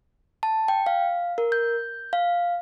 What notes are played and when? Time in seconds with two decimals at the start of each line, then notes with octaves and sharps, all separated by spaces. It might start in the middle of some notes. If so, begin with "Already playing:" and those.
0.43 A5
0.68 G5
0.86 F5
1.38 A#4
1.52 G6
2.13 F5